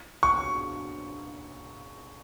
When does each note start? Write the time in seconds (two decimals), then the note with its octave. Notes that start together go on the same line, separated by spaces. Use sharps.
0.23 C#6